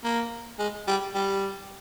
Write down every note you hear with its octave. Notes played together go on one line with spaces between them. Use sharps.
A#3
G#3
G3
G3